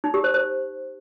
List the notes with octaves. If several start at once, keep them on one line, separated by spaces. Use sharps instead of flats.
D#4
G4
C5
C5